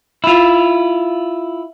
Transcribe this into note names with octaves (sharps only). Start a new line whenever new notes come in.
E4 F4